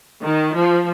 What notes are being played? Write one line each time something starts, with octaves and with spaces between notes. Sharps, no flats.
D#3
F3